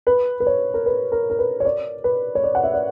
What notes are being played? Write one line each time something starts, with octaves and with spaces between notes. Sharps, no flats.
B4
B4
C#5
A#4
B4
A#4
A#4
B4
C#5
D5
B4
C#5
D5
F#5
E5
D5